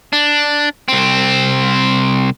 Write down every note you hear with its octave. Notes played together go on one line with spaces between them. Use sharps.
D4
C2 C4